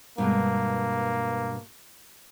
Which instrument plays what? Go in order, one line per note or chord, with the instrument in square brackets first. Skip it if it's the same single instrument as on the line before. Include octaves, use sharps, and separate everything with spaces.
[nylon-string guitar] G2 B2 G#3 [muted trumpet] A#3